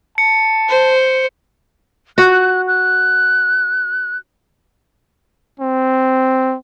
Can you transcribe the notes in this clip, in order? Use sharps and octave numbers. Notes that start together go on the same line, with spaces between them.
A5 C#7
C5
F#4 F#6
F#6
C4